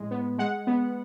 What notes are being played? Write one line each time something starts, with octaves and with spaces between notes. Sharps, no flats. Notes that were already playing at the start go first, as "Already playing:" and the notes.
Already playing: A2 G#3
B3
G#3 F#5
B3